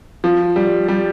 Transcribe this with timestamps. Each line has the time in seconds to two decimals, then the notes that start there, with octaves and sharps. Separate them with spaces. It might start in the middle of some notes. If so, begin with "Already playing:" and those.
0.24 F3
0.56 G3
0.88 G3